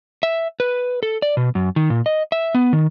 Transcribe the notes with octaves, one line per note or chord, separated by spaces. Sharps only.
E5
B4
A4
D5
B2
F#2
D#3
A#2
D#5
E5
B3
D#3